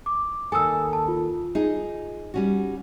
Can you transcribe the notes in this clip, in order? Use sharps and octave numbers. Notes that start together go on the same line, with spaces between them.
D6
D#2 A4 G#5 D#6 E6
A5
F4
D#4 G#4
G3 C#4 F#4